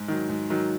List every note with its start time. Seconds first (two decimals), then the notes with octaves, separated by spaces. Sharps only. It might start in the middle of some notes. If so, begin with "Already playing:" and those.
Already playing: G#2
0.08 D#3 F#3
0.29 G#2
0.50 D#3 F#3